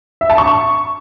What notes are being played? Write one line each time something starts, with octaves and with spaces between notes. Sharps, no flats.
E5
A5
C#6